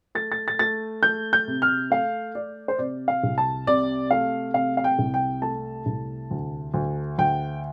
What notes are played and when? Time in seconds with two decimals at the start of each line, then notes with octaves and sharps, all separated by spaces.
0.15 A3 A6
0.32 A6
0.48 A6
0.59 A3 A6
1.03 A3 G6
1.33 G6
1.48 C3
1.62 F6
1.90 A3 F5
2.35 A3 D5
2.68 C5
2.79 C3 D5
3.08 F5
3.23 C2
3.38 A5
3.67 C3 D5
4.11 A3 F5
4.54 C3 F5
4.77 F5
4.84 G5
4.99 C2
5.14 G5
5.42 A3 A5
5.86 C2
6.31 D2
6.74 D2
7.18 D2 G5